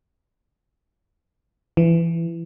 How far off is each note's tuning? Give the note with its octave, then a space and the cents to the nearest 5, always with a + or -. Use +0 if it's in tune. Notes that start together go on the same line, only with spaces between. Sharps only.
E3 +20